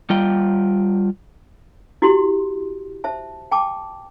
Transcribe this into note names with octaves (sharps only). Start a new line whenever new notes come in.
G3 F4 G5
E4 F#4 G4 B5 C6
C5 E5 A5
G5 A5 D6